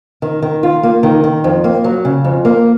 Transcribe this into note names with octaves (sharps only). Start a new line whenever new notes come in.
D#3
D#3
F4
A#3
D#3
D#3
F2
A#3
F#3
C#3
F2
A#3